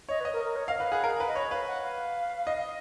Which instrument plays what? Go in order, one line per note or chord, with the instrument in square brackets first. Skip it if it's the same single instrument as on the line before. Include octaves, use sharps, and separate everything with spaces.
[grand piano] C#5 [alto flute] D#5
[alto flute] B4
[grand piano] D#5
[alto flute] A#4
A#4
C#5
[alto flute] D#5 [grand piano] F5
[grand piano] B4 [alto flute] F5
[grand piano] G#4 [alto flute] F#5
[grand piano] A#4 [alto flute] F5
[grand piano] B4
[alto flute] D#5
[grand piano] C#5
[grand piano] B4 [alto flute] F5
[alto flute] F#5
F5
[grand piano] D#5